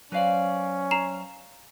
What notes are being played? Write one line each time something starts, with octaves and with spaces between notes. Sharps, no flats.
F#3 C#4 B4 C5 D5 F5
A#5 C7 E7